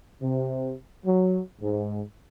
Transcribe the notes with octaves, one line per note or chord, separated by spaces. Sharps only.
C3
F#3
G#2